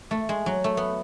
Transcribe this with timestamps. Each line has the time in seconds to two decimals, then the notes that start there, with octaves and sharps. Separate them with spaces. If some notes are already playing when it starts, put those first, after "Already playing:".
0.11 A3
0.29 G#3
0.46 F#3
0.64 A3
0.77 B3